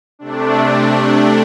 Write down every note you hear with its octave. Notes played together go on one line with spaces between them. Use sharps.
C3 A3 D4